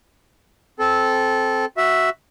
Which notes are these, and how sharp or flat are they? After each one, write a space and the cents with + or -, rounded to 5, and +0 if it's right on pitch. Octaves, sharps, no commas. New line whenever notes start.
C4 +0 A4 -15
F#4 +0 E5 +0